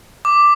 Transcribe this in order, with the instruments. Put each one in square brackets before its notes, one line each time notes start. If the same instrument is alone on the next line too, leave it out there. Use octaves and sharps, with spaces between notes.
[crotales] D6